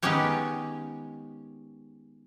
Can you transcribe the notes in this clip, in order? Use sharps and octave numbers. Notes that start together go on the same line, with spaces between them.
D#3 G#3 B3 C#4 G4 C#5